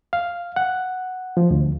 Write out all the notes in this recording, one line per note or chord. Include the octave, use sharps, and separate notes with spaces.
F5
F#5
F3
D2